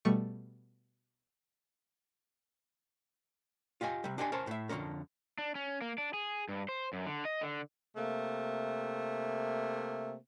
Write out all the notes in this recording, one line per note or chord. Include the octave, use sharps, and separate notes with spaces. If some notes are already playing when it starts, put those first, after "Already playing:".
B2 G3 A3 C#6
F4 G4 D#5 G#5
C3 G3
D4 G4 D5 D#5 G5 G#5
C#4 A#4 C5 A5
A2 E5
F2 D3 F#3 A3 C#4 A#4
D4
C#4
A#3
D4
G#4
G2
C5
F#2
D3
D#5
D3
C3 A3 A#3